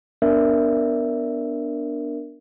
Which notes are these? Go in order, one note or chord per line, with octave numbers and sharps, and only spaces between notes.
B3 D4 A#4 D5 E5